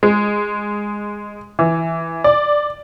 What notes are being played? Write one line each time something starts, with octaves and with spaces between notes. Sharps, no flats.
G#3
E3
D5